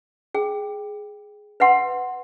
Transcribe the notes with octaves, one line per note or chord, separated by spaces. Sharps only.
G#4 G5
B4 E5 F#5 C6